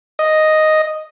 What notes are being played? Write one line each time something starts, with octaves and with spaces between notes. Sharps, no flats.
D#5